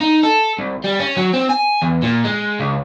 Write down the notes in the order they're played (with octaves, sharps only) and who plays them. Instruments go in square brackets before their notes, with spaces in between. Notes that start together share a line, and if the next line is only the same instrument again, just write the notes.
[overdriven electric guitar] D#4
A4
C2
G3
C#4
F#3
C4
G#5
E2
A#2
G#3
C#2